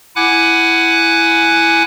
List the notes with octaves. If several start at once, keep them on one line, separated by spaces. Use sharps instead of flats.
E4 F#5 G#5 D6 F#6